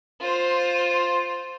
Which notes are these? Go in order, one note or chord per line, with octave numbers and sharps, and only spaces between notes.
F4 C5